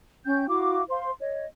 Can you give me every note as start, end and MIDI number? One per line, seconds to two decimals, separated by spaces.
0.25 0.47 61
0.25 0.47 79
0.25 0.47 91
0.48 0.82 64
0.48 0.82 66
0.48 0.82 77
0.48 0.82 86
0.89 1.11 72
0.89 1.11 77
0.89 1.11 84
1.20 1.44 73
1.20 1.44 75